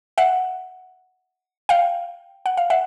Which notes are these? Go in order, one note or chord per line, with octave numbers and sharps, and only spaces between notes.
E5 F#5
F5 G5
F#5
F5
E5 F#5